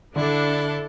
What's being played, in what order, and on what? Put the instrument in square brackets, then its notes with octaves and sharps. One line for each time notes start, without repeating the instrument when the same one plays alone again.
[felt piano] D3 [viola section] D4 [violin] E4 A4